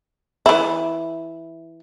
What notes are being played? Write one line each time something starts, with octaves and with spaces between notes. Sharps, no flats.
E3 E4